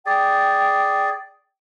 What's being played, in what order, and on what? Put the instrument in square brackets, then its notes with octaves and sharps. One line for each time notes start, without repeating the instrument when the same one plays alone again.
[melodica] G#4 D5 [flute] G5